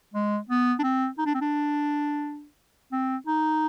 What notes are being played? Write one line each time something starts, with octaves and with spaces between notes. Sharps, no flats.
G#3
B3
D4
C4
D#4
D4
C4
D4
C4
D#4